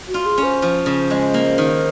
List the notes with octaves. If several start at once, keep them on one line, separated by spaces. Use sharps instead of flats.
F#4
F4
G#4
C#4
C5
F3
C#3
G#3
A#3
D#3